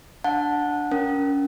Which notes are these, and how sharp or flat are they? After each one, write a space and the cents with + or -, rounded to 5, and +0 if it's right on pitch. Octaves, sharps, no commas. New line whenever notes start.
D4 +0 F#5 -20 A5 +0
C#4 +30 A#4 +5